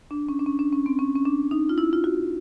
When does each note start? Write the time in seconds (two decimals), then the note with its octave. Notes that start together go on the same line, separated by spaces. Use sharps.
0.11 D4
0.29 C#4
0.39 D4
0.46 C#4
0.59 D4
0.72 C#4
0.86 C4
0.99 C#4
1.15 C#4
1.26 D4
1.51 D#4
1.69 F4
1.78 E4
1.93 F4
2.04 F#4